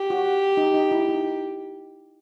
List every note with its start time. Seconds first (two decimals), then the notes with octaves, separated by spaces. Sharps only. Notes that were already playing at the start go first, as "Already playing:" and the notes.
Already playing: G4
0.10 F#4
0.57 D#4
0.74 D#4
0.91 E4
1.09 D#4